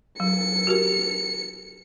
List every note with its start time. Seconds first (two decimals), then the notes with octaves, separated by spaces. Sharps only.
0.20 F#3 C#7
0.67 F#4 G4 A#4